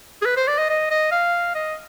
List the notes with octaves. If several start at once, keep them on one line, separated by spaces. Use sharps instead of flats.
G#4
B4
C5
D5
D#5
D#5
D#5
F5
D#5